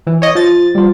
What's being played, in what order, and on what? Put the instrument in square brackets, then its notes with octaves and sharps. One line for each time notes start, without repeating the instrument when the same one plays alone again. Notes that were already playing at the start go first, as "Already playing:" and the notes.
[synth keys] E3
C#5 D#5
[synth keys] F3 A6 [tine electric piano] F4
[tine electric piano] G3 F4